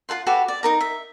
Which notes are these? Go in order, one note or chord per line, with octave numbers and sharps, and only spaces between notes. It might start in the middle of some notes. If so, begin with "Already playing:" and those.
F4 A4 F#5 C6
F#4 G4 A4 B4
D5
D#4 A#4 A#5
E5